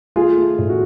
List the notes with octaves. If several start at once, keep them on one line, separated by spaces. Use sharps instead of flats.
A3 F4 G#4
A3
A2
F#4